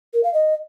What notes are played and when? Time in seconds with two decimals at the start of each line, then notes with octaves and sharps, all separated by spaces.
0.14 A#4
0.23 F5
0.33 D#5